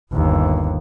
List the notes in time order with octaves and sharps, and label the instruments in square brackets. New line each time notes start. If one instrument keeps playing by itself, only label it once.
[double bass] G1 D#2